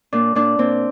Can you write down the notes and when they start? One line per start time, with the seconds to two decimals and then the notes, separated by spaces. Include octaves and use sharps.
0.13 A#2 D4
0.35 A#2 D4
0.59 A#2 C4